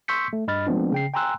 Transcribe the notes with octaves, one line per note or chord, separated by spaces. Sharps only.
C6 C#6 E6 G6 B6 C#7
A3
G2 D#5 B5 F6 A6
F3 G#3 A3 B3 C4 D4
C#3 G5 C7
G5 G#5 A#5 C6 E6 F#6